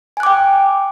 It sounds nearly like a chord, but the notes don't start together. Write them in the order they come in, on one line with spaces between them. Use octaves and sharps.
G#5 F#6 D6 G5